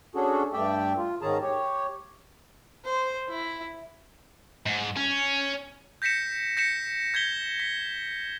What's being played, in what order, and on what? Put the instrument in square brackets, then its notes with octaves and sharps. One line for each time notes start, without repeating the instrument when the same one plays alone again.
[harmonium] C#4 D4 F#4 G#4 A4
G2 A3 G4 D5 E5 G5
F4
G#2 D#3 C#4 G#4 A5 A#5
G4 C#5
[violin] C5
E4
[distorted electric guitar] G#2
C#4
[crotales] G6 A#6 B6 C#7 E7
G6 A#6 B6 C#7 E7
G6 G#6 B6 G7
B6